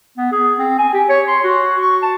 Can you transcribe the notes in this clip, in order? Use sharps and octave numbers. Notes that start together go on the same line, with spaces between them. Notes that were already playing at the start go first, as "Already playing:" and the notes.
B3
G#4
C4
G#5
G4
C#5
C6
F#4
C#6
A5